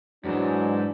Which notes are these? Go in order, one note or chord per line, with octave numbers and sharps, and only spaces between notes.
F2 G#2 E3 F#3 G#3 D4